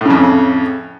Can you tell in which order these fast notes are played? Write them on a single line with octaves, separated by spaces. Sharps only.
A2 C#3 F2